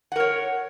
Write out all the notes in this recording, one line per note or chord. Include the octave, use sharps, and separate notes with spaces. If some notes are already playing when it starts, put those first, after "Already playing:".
A#4 C#5 F#5